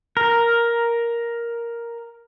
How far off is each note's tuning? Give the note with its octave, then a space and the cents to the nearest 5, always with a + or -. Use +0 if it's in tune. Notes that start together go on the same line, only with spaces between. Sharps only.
A#4 +5